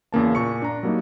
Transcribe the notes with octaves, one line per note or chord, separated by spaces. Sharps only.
E2 C#3 A#3 A5
A#2 C#6 C#7
D4 A#5
F#3 G3 A#3 D4 D#4